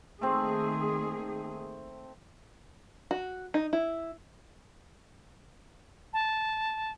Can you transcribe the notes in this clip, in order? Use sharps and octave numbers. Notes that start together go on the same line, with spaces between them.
D#3 A3 A#3 C4 G#4
F#4
D#4
E4
A5